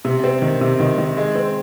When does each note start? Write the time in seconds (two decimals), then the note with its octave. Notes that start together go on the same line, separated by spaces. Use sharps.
0.05 C3
0.24 C4
0.42 D#3
0.61 C3
0.80 D#3
0.98 D#3
1.17 G#3
1.35 C4